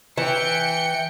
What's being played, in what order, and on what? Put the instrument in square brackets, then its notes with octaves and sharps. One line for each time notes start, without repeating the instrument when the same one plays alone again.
[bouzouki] E3 [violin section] G5 C#7